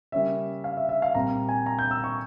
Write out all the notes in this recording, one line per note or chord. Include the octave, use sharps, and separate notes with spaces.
C#3 G3 A#3 C#4 E5
F5
E5
E5
F5
A#2 G3 C4 A#5
G#5
A#5
G6
E6
C#6